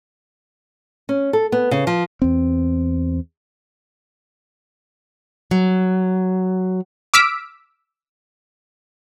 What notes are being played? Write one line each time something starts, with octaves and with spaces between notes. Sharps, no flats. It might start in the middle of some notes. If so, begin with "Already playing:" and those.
C#4
A4
B3
C#3
F3
E2 C4
F#3
D6 E6 F6 B6 D7